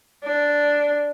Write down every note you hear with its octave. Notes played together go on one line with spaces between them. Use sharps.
D4